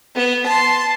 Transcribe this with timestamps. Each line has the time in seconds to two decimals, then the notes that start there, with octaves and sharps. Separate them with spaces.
0.16 B3
0.46 A5 C6